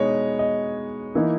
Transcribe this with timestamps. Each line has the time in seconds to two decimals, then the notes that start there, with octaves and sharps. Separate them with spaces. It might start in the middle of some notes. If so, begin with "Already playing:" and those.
Already playing: B2 G#3 B3 D#4 C#5 D#5
0.39 D#5
1.15 E3 A#3 D#4 E4